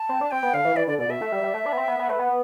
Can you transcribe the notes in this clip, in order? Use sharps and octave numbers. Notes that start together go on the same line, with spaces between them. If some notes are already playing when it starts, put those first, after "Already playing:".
Already playing: A5
C4
D4
C4 G5
B3
D3 F5
E3
E3 D5
D3 D5
B2 D5
B2 E5
A3
G3
G3
A3
D4
B3
C4
B3
B3
A3 B4
B3